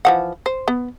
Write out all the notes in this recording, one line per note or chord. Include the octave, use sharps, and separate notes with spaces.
E3 F3 F#5
C5
B3